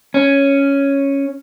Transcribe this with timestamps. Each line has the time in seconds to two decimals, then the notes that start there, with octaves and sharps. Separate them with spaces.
0.14 C#4